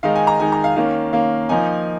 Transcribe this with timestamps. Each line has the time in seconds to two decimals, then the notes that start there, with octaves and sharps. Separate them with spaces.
0.03 D#3 G#3 D#4 F5
0.16 G#5
0.27 A#5
0.40 D#3 G#3 D#4 G#5
0.52 A#5
0.64 F5
0.76 D#3 A#3 C#4 F5
1.13 D#3 A#3 C#4 F5
1.49 F3 A#3 D#4 G#5